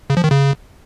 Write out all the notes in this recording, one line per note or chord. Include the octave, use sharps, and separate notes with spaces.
C#3
F3
D#3
C#3